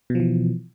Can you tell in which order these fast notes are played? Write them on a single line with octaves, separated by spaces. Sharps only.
B2 F3 E3